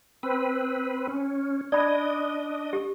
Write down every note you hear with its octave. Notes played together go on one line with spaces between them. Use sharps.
C4 B4
C#4
D4 D5 D#5 B5
G4